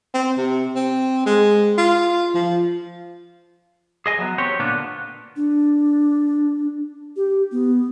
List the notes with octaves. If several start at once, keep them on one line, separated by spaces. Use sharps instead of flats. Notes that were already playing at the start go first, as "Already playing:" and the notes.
C4
C3
C4
G#3
F4
F3
G#4 D#5 G#5
F#3 B3
C4 G4 C#5
A#2 D3 A#3 B3 D4
D4
G4
B3